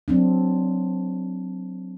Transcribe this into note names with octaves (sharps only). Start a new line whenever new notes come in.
F#3 C4 D4